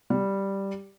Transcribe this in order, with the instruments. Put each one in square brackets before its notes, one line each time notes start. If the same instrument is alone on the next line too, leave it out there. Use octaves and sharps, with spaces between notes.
[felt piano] G3